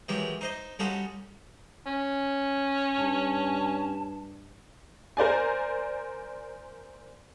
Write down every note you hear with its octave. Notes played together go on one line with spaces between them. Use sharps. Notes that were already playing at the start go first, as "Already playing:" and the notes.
D#3 E3 F#3 G#3 G4
D#4 C5 D#5
G3 C#4 D#4 F4 F#4 A4
C#4
G2 A5
A#4 C5 D5 G#5